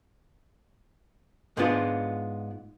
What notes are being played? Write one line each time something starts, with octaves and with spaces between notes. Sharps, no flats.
G#2 G#3 B3 D4 F4